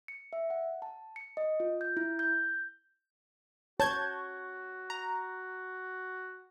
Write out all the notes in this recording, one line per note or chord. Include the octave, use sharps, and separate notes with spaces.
C#7
E5
F#5
A5
C#7
D#5
F4
G6
E4
G6
F#4 C#5 A5 G6 G#6
A#5